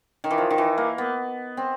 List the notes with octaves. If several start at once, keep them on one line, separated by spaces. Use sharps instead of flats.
D#3
E3
F3
D#3
E3
A#3
B3
C4